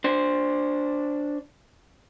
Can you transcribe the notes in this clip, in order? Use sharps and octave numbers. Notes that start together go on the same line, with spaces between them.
D4 C5